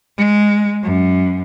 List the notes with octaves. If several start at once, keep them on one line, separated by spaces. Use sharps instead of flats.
G#3
F#2